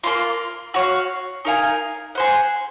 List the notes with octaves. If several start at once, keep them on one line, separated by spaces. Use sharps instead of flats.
A#3 C#4 F4
F#4 C#5 F5
D#4 A#4 F5 G#5
G#4 C5 F#5